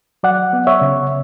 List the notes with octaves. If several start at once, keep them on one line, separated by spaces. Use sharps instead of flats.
F#3 D5 F#5
B3
C#5 E5
C#3